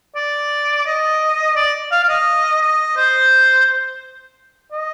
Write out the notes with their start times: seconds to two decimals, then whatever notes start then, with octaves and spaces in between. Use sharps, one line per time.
0.16 D5
0.86 D#5
1.56 D5
1.92 F5
2.03 F5
2.09 D#5
2.62 D#5
2.97 C5
4.72 D#5